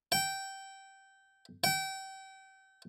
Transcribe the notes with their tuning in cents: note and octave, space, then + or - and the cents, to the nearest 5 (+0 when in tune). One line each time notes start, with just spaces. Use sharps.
G5 -15
G5 -30